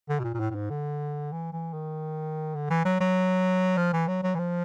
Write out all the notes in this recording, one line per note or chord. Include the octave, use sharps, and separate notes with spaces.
D3
B2
A#2
A#2
A2
A2
G#2
D3
E3
E3
D#3
D3
E3
F#3
F#3
F3
E3
F#3
F#3
E3
F3